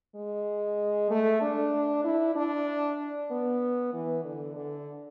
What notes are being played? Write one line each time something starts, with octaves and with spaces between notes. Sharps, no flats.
G#3
A3
D4
E4
D4
B3
E3
D3
D3